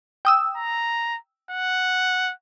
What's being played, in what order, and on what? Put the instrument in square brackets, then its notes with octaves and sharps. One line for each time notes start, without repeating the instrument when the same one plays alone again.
[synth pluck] G5 D#6 E6
[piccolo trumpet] A#5
F#5